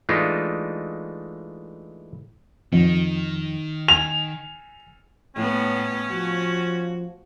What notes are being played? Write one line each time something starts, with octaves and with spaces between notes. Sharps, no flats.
E3 G#3 A3 D4 D#4 F4
F2 D#3
G#5 F7
A2 B3 C#4
F3 F#4